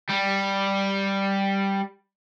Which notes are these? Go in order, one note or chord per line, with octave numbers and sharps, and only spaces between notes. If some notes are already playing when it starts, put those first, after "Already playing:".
G3